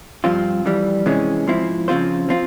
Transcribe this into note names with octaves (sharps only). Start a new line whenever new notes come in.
G2 F3 C4 F4
F2 E3 G3
C3 E3 G#3 C#4
G#2 F3 C4 E4
C#3 F3 C4 F4 C5
F3 C4 F4